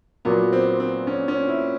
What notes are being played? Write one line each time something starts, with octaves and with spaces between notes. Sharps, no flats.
A#2 F#3 A#3 B3
C4
C4
C#4
C#4
E4